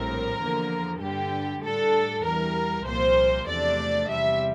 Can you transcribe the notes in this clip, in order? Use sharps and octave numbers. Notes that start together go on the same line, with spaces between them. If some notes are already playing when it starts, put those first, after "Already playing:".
Already playing: A#1 A2 G3 C4 A#4
E2 D3 F3 A#3
G2 D3 G3 G4
A2 G3 D4 A4
E2 E3 G3 A#4
C2 A#2 F3 A#3 C5
E2 C3 F3 A3 D4 D5
E2 C3 G3 E5